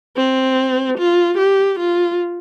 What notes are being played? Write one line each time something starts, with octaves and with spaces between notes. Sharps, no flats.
C4
F4
G4
F4